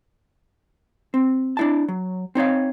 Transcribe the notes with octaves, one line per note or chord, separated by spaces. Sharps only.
C4
D4 E4 A5
F#3
C4 D#4 C#5 F5